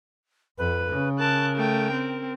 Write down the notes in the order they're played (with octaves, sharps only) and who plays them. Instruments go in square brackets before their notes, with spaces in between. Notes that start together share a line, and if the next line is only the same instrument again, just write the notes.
[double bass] F2 [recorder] B4
[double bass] C#3
[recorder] A#4 [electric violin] A5 F#6
[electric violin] A3 G5
C4